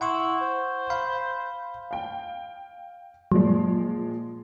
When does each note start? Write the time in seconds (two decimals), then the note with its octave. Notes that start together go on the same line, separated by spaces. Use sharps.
0.01 E4 F#5 C6 C#6
0.41 C5
0.90 F5 B5
1.91 F5 G5
3.32 A#2 F3 F#3 G#3